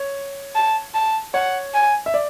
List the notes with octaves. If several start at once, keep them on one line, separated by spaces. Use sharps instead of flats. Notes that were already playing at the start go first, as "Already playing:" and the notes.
Already playing: C#5
A5
A5
C#5 F#5
G#5
E5
D5